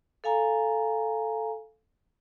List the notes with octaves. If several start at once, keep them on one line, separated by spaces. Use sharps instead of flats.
A4 F5 G#5 A#5